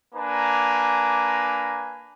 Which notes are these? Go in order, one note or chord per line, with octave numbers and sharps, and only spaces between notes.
A#3 D4 B4 G#5 A#5